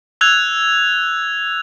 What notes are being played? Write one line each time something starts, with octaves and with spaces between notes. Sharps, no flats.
E6 F#6 G#6 F7